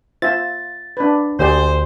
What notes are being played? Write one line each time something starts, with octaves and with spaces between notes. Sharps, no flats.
F4 C5 E5 A6
D4 B4
D2 G4 G#4 C5 D5